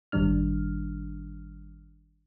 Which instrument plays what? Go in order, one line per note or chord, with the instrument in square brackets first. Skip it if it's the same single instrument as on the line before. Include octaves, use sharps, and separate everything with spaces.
[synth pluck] G#1 F#2 D#3 G3 D4 F6